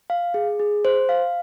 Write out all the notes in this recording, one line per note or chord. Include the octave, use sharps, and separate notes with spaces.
F5
G#4
G#4
C5
F5